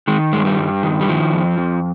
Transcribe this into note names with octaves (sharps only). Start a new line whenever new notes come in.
D#3 G#3
G2 G#3
G3
G2
D#3
G3
D#3 F3
F2
F2